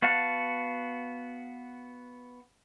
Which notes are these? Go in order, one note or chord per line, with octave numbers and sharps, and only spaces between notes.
B3 F#4 F5 F#5 A5